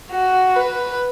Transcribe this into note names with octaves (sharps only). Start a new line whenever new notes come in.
F#4
B4